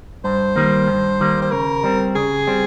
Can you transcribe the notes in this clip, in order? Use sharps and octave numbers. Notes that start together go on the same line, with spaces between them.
G2 C5
D#3 G3 A#3
G2
D#3 G3 A#3
C5
C#3 A#4
G3 C4
C#3 G#4
G3 C4